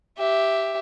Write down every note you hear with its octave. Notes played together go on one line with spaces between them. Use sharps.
G4 E5